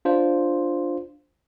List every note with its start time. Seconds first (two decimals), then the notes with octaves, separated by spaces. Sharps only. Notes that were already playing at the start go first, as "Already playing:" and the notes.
0.05 D4 F4 C5